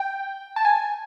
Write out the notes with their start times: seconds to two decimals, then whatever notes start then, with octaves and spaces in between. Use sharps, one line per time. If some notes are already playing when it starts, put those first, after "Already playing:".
Already playing: G5
0.56 A5
0.65 G#5